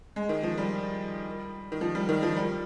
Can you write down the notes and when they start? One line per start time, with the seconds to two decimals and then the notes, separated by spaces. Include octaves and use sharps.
0.16 G#3
0.29 D#3
0.43 F3
0.58 G3
1.72 D#3
1.81 F3
1.95 G3
2.09 D#3
2.23 F3
2.37 G3